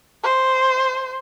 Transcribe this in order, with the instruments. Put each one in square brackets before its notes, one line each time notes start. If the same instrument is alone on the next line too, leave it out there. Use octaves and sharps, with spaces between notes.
[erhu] C5